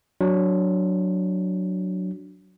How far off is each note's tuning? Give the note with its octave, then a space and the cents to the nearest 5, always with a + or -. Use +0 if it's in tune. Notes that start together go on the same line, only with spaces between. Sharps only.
F#3 +0 D4 +0